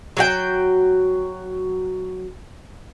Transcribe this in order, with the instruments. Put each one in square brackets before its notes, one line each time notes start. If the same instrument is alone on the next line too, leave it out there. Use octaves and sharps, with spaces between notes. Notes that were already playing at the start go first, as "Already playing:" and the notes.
[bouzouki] F#3 F#4 G5